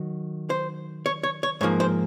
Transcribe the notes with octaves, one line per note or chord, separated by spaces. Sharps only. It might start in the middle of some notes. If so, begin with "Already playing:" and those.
Already playing: D#3 F#3
C5
C#5
C#5
C#5
G#2 F3 A#3 C#5
C5